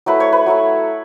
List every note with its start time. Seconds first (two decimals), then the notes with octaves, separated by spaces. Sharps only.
0.06 F#3 A3 E4 B4
0.20 C#5
0.32 B4
0.46 F#3 A3 E4